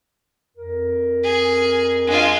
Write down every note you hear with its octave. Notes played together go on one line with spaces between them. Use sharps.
F2 A#4
G#4
G#3 D4 F4 D#5 F#5